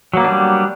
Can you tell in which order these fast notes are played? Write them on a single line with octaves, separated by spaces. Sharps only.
F#3 A#3 B3 D4 G3